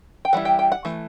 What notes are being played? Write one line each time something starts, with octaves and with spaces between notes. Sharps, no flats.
G5
E3 G3 E4 F#5
G5
G5
F#5
E3 A3